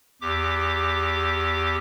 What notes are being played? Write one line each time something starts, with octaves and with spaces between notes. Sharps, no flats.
E2 G4 D6